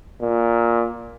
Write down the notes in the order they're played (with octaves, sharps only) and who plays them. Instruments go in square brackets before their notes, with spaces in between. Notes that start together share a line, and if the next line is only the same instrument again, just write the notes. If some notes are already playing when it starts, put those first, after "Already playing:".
[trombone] A#2